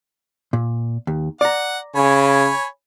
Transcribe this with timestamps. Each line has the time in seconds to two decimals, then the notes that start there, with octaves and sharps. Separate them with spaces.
0.53 A#2
1.07 D#2
1.41 D5 F#5 A#5
1.96 C#3 C#5 G#5 B5